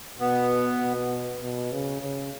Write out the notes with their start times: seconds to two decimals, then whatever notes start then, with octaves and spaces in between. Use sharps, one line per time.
0.19 B2 B3
0.80 B2
1.42 B2
1.72 C#3
2.02 C#3